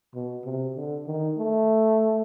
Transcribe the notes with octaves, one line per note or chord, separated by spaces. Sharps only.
B2
C3
D3
D#3
A3